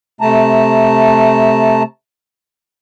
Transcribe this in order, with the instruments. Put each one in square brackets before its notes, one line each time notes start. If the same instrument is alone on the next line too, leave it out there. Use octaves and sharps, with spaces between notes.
[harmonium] C3 A3 A5 A#5